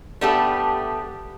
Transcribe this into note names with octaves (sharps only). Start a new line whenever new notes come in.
G3 A3 B3 D4 G4 A4